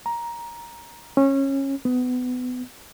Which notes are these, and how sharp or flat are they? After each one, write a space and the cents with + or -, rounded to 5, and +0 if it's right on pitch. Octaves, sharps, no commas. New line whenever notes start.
A#5 +10
C#4 -20
B3 +25